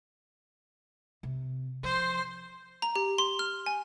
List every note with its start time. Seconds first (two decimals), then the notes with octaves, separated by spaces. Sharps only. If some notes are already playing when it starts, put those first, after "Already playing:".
1.23 C3
1.83 F3 C5 C6
2.82 A#5
2.96 G4
3.18 C6
3.39 F6
3.66 G#5